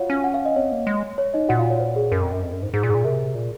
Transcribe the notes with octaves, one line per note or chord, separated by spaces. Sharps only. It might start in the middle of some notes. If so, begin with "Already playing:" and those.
Already playing: F4 F#4 C#5 F5 F#5
C#4
F#5
F5
D#5
C4 C#5
A#3
G#3
C#5
D#4 D#5
A#2 F#4 F#5
F4 F5
C#5
C5
G#4
F#2 A#4
F2
F#2
F2
F#2
G#2
G#2 G#4
A#2
G#2 G#4
A#2
C3 A#4
A#2